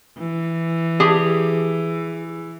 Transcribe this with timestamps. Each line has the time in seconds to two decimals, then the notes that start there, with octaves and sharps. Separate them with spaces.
0.19 E3
1.00 G4 G#4